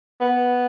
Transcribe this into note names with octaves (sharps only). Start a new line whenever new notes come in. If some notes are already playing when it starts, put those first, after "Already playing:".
B3